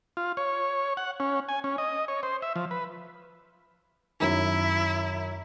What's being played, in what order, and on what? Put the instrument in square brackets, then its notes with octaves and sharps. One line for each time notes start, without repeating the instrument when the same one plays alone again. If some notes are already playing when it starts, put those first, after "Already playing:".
[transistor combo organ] F4
C#5
F#5
C#4
G#5
C#4
D#5
C#5
C5
E5
F3
B4
[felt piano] F#2 D#3 [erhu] E4